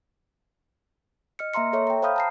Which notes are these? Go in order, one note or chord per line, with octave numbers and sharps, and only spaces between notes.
D#5 F6 C#7
A#3 E5 A#5 C6 C#7
A4 C#5 E5 C#6
G5 A#5
C5 F5 B5 D#6 F6 G6
A5 A#5 C7